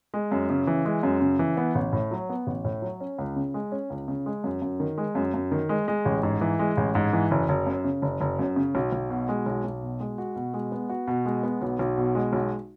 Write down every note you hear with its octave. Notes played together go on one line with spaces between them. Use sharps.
G#3
F#2
C#3
E3
G#3
F#2
C#3
E3
B3
A1
A2
F#3
B3
A1
A2
F#3
C#4
C#2
C#3
G#3
C#4
C#2
C#3
G#3
F#2
F#2
D#3
G#3
F#2
F#2
D#3
G#3
G#3
A1
G#2
E3
G#3
A1
G#2
E3
F#1
F#1
F#2
C#3
F#1
F#1
F#2
C#3
B1
B1
B2
G#3
B1
B1
B2
G#3
F#4
B2
G#3
B3
F#4
B2
G#3
B3
B1
B1
B2
G#3
B1